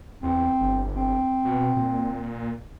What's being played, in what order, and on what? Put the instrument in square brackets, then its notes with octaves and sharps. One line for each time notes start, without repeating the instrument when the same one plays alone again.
[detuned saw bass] E2 [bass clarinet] C4
[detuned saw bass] G1
[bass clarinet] C4
[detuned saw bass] B2
A#2